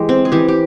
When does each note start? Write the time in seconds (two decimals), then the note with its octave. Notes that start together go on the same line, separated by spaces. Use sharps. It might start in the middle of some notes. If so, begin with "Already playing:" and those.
Already playing: E3 G#3 G4
0.09 C4
0.25 G#4
0.32 E3 G4
0.48 G4